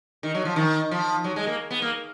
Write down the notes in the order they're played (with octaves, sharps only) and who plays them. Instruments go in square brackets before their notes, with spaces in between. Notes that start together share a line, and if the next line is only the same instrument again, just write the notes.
[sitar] D#3
F#3
F3
D#3
F3
F#3
G#3
A#3
B3
A#3